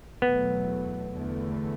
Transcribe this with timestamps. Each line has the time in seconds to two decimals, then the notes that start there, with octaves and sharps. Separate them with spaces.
0.22 E2 B2 F#3 A3 B3
1.14 E2 D3 A3